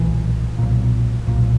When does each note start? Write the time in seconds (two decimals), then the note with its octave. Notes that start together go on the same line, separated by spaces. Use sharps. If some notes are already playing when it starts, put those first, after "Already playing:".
Already playing: B1 A#2 E3
0.59 B1 A#2
1.27 B1 A#2